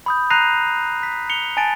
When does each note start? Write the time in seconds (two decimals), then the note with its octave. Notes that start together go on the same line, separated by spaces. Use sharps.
0.06 B5 D#6 G6
0.30 A#5 F#6 A#6 C7 D#7 F7
1.03 B6
1.30 C#7 F7 G7
1.57 G#5 A5 A6 D7